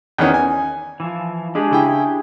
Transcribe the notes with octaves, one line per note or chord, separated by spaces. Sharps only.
E2 D#3 C#4
G#5
E3 F3
G#3 D4 G4 G#4
C#3 E4 G5